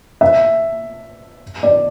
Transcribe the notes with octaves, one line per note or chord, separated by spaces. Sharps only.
E5
D5